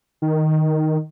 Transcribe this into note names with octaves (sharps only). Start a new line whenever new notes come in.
D#3